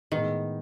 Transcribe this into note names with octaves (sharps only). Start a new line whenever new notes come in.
A2 D#3 G#3 B3 D#4 G#4